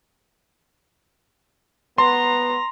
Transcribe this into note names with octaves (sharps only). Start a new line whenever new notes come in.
B3 A#5 C6